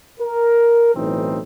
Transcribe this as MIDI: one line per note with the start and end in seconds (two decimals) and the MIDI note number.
0.19 0.94 70
0.95 1.41 35
0.95 1.41 45
0.95 1.41 52
0.95 1.41 60
0.95 1.41 63